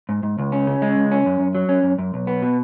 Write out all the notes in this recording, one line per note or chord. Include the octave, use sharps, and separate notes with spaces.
G#2
G#2
C#2
C#4
C#3
G#3
C#2
C#4
F#2
F#2
F#3
C#4
F#2
F#2
B1
B3
B2